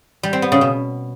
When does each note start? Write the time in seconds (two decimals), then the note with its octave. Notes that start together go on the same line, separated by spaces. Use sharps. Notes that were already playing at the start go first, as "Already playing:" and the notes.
0.23 G3
0.33 C4
0.42 B3
0.52 C#3
0.61 B2